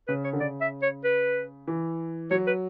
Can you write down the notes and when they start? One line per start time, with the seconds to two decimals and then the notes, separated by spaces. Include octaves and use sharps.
0.08 C#3 B4
0.24 C#5
0.33 D3
0.40 C#3 D5
0.61 E5
0.82 C#5
1.04 B4
1.67 E3
2.31 F#3 C#5
2.47 B4